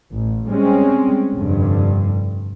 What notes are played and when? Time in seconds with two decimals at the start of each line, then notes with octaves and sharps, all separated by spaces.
0.13 A1
0.51 G3 G#3 C4 C#4
1.35 F1 G2 D3